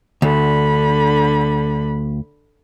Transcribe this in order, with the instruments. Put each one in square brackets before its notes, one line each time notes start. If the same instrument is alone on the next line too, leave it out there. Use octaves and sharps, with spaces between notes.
[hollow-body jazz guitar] D2 [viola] D3 B5